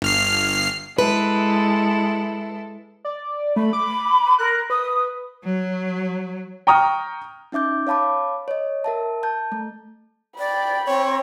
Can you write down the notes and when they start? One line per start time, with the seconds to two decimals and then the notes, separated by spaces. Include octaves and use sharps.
0.02 G1 F6 C7
0.98 G#3 E4 A4 B4
3.05 D5
3.56 A3 B5
3.73 D6
4.39 A#4 F#6
4.70 B4 D#6
5.44 F#3
6.67 G5 A#5 C#6 D#6 F6
7.52 C#4 D#4 E5 D6 G6
7.87 C#5 F5 A5 B5 D6
8.48 C#5 D#5
8.84 A#4 E5 A5
9.23 A5 G6
9.52 A3
10.39 D5 G5 B5
10.88 C4 C#5